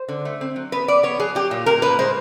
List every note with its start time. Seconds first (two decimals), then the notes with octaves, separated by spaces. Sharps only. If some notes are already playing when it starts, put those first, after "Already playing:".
Already playing: C5
0.09 D3
0.25 A3
0.41 C4
0.56 F#3
0.72 B3 B4
0.88 B3 D5
1.03 B3 C#5
1.19 F#3 G#4
1.35 F#3 G4
1.51 A#2
1.66 A#2 A#4
1.82 A#2 B4
1.99 G#3 C5